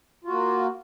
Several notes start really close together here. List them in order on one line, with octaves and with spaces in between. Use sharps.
F4 F#4 A#3